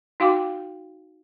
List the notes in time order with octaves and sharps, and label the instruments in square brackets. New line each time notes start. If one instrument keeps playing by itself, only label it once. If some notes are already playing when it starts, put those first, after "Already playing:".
[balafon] D#4 F#4 F5 G5 C6 D6